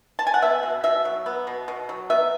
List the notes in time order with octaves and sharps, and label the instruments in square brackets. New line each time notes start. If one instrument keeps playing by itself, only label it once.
[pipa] A5
G#5
F#5
B3 E5
B2
B2 E5
F#3
B3
B2
B2
F#3
B3 E5